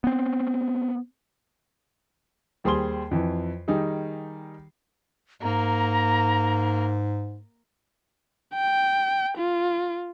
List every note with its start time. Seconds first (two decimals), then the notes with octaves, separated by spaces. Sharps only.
0.04 B3 C4
2.64 D#2 G3 G#4 C5 C6 G7
3.11 F2 E3
3.68 D#3 G3 D#4 G#4
5.42 G#2 A#3 A#5
8.54 G5
9.38 F4